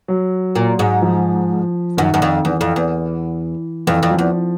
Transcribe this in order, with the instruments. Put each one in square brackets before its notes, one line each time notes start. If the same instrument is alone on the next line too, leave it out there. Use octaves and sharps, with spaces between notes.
[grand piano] F#3
[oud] A#2
G#2
[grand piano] F3
[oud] F#2 [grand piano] D#3
[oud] F#2
F2
[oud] E2 [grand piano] E3
[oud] F2
E2
[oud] F2 [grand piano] E3
[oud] F2
[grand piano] F3
[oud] E2